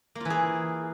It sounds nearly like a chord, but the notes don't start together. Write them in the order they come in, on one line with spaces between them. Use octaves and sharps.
A#3 F4 E3 G#4